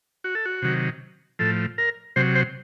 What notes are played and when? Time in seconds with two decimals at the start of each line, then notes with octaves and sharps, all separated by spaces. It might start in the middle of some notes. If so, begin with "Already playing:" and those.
0.24 F#4
0.35 A4
0.45 F#4
0.62 C3 D#3 F#3
1.39 A2 F3 A4
1.78 A#4
2.16 C3 F#3 C5
2.35 C5